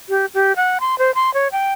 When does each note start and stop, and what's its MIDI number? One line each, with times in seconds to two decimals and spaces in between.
0.09 0.26 67
0.34 0.55 67
0.56 0.78 78
0.80 0.98 84
0.98 1.14 72
1.15 1.33 84
1.34 1.48 73
1.52 1.73 79